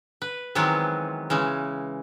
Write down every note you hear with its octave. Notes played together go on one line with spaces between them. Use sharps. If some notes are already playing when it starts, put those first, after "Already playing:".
B4
D#3 E3 F#3 G#3 B3 C4
C#3 E3 G#3